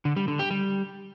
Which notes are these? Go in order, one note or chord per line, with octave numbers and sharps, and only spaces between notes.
D3
G3
D3
G4
G3